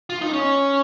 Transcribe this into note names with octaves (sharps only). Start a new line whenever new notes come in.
F4
D#4
C#4